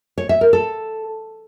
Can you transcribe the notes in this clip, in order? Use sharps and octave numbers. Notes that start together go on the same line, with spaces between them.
C#5
E5
A#4
A4